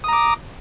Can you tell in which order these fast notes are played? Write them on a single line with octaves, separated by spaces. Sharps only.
D#6 A#5 D6